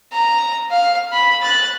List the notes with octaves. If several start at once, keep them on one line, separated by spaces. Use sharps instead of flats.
A#5
F5
B5
F#6 A6